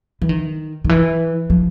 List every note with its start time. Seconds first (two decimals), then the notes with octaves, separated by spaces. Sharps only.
0.22 E3
0.29 D#3
0.84 D#3
0.89 E3
1.50 F3